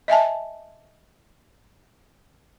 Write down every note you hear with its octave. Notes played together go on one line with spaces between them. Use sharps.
D#5 E5 G#5 A5